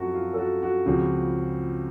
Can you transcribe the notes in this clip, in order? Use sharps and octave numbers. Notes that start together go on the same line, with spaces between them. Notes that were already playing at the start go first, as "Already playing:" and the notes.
Already playing: F#2 F3 A3 C4 F#4 A4
F4
A4
F#4
F#4
C#2 C#3 F3 C4